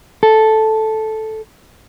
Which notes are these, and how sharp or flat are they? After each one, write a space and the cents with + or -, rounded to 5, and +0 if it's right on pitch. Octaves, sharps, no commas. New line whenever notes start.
A4 -5